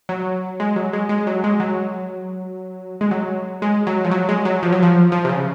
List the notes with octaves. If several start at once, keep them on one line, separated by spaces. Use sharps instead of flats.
F#3
G#3
F#3
G#3
G#3
F#3
G#3
F#3
G#3
F#3
G#3
F#3
F3
F#3
G#3
F#3
F3
F#3
F3
F3
C3
C#3